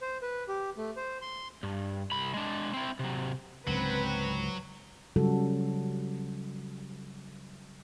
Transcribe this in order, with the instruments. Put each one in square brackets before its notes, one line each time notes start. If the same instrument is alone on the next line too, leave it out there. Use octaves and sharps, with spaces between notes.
[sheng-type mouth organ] C5
B4
G4
A3
C5
C6
[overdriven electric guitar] G2
C2 B5
G#3 D4
C4 E4
C3 F#3
[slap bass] C#2 G#2 D3 [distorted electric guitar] F#3 [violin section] C4 B4
[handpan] C#3 F#3 G3 F#4 A4